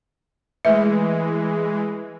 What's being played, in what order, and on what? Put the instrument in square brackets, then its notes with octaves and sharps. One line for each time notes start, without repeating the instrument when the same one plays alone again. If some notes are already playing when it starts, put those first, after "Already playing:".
[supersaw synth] E3 G#3 [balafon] A3 B4 E5